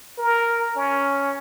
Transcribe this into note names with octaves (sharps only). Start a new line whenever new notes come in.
A#4
C#4